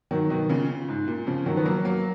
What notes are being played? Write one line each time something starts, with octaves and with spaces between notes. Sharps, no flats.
D#3 F#3
B2 D#3
A#2 C#3
G#2
A#2
C#3 F3
D#3 F#3
B3
F#3 A#3
F#3 A#3